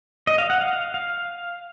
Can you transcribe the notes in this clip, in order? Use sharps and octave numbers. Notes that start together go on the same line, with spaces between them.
D#5
F5
F#5
F5
F5